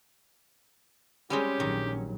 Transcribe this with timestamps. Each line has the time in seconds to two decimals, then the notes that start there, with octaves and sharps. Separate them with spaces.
1.30 G3 G#3 C4 C#4 G4
1.60 A#1 D#3 F#3